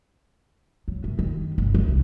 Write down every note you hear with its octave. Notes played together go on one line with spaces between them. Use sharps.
F#3
F#2
D#3
G1
E3
C2